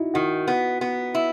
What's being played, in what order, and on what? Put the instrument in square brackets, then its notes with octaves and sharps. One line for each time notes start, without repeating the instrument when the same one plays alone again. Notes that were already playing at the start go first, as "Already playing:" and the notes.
Already playing: [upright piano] D#4 E4 F#4
[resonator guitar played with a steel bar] D#3 [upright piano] F#4
[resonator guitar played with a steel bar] B3
B3
E4